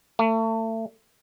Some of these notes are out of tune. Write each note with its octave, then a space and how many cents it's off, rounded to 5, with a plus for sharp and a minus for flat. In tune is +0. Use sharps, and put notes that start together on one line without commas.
A3 +30